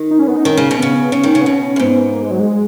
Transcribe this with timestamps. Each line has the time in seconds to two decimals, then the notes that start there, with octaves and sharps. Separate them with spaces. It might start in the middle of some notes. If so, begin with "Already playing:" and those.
Already playing: D#3
0.11 D#4
0.19 C#4
0.27 B3
0.36 D#4
0.44 D#3 C#4
0.57 C#3
0.71 B2
0.79 C#3 B3
1.12 C#3 C#4
1.23 D#3
1.35 C#3
1.41 B3
1.46 B2 C#4
1.76 F#2
1.80 G#2 B3
2.13 A#3
2.22 G#3
2.31 F#3
2.40 G#3